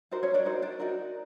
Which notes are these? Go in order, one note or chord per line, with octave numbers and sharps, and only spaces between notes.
D#4 F#4 A#4 C5
C#4 C#5
D4 D5
D#4 F#4 A#4 C5
D4 D5
D#4 F#4 A#4